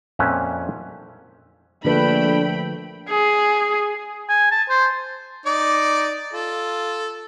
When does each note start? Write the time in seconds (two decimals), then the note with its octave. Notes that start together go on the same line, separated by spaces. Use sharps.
0.19 F2 A#2 C#4 E5 F#5 G5
1.84 A#1 D3 F3 A3 D4 B4 G5 B5
3.09 G#4
4.29 G#5
4.51 A5
4.69 C5
5.46 D#4 D5 D6
6.34 F4 A4